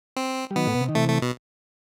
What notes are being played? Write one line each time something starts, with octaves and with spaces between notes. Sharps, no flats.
C4
G3
D#3 F#3 B3
A2
B2
C3
D#3
C3 E3 A3
A3
B2